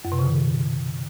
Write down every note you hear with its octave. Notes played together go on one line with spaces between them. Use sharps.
F#2
C3
C#3
D#3
B2